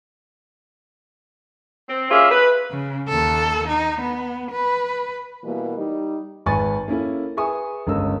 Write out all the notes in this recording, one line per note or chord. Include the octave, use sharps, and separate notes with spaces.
C4
G3 A#3 C#4 F4 G#4 E5
B4
C#3
D#2 A4
D#4
B3
B4
B2 E3 G3 A#3
G3 D#4
G#1 B4 G#5 C#6 A6 D#7
A#3 C#4 E4 A4
G#4 B4 E5 G#5 C#6 D#6
G1 C#2 C#4 A#4 D#5 E6